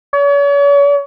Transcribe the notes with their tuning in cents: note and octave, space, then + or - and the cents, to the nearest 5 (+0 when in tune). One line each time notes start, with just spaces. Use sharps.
C#5 +40